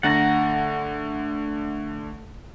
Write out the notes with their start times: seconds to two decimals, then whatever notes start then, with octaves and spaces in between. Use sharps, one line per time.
0.03 D3 A3 F#5 A#5 A6